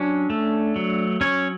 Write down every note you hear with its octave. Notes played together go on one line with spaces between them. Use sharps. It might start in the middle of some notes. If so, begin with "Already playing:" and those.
Already playing: F#3 C#4 D4
A3
F#3
F#3 C#4 C#5